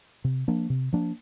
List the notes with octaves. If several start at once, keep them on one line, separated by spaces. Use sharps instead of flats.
C3
F3 A#3 D4
C3
F3 A#3 D4